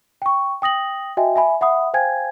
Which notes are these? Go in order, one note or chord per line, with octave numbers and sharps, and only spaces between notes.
G5 C#6
G5 D#6 A#6 F#7
F#4 D#5 E5 G5 G#5
E5 G#5 B5
E5 F#5 B5 D#6
C5 F5 G5 G#5 G#6